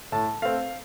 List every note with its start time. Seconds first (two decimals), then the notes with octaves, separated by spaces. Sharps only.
0.12 A2 A5
0.42 A3 C4 F5